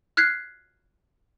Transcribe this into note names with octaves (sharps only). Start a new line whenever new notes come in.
F6 F#6 G#6 B6 C7